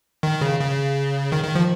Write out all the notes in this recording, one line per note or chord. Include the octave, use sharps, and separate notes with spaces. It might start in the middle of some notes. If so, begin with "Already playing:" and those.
D#3
C#3
C#3
D#3
D#3
F3